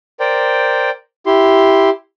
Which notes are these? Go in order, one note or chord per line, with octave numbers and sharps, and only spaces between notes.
A#4 C5 D5 G5
E4 G4 C6